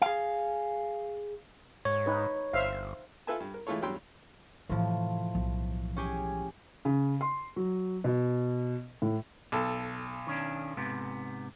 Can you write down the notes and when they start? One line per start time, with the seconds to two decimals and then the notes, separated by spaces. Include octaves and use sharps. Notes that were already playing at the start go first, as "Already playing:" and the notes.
0.02 G#4 F5
1.85 G#2 C#5
2.06 D#4 B4
2.53 G1 C5 E5 F5
3.27 F4 A4 B4 E5 G#5 A5
3.40 G2
3.54 A#4
3.67 E3 G#3 A3 F4 A4 C#5
3.82 E2 G2 F#3 G5 C6 E6
4.69 A2 C3 E3 F3
5.35 B1 E3
5.96 C#4 G4 G#4
6.85 C#3
7.21 C6
7.56 F#3
8.04 B2
9.02 A2
9.52 B1 A4
10.27 D#3 C#4 D4
10.77 G#2 C3 B3